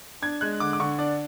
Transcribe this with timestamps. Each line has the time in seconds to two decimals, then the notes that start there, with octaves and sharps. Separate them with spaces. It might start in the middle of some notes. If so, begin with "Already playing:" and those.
0.22 D4 G#6
0.41 G#3 F#6
0.60 D3 D6
0.73 D6
0.80 D3 C#6
0.98 D4 D5